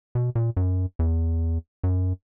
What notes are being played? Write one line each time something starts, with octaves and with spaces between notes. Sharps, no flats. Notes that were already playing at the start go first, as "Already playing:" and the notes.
B2
A#2
F#2
E2
F#2